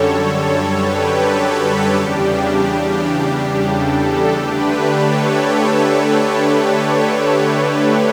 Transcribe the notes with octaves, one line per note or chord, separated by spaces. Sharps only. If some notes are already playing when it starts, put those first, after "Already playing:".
Already playing: F#2 D3 G3 A4 C#5
A4 C#5
G4 B4
A4
E2 C#3 G3 D4 G4
A4
D3 A3 D4 G4 B4
A4 C#5
A4
G4